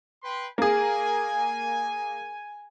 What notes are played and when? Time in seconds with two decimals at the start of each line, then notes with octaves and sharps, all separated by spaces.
0.23 B4 G5 C6
0.58 A#3 G#4 G#5